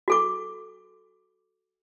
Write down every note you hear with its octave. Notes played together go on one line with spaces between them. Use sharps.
F#4 A4 D6